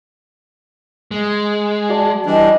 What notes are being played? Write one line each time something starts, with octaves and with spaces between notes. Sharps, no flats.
G#3
F#4 D5 A5
E3 G3 D4 D#5